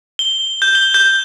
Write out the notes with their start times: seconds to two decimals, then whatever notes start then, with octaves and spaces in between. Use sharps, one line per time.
0.19 G7
0.62 G6
0.75 G7
0.94 G6